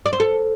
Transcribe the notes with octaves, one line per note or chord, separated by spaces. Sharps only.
D5
C5
A4